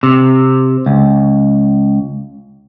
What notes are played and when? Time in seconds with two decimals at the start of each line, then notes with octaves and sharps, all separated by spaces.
0.03 C3
0.86 C#2